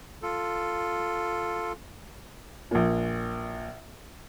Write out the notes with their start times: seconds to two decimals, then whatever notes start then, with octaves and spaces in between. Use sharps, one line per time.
0.23 F4 A4
2.71 A#1 A#2